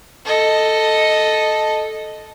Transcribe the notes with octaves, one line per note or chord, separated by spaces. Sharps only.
A4 D#5